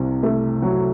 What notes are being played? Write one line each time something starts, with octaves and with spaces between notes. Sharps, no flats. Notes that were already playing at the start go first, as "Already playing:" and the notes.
Already playing: C2 C3
A3
F#3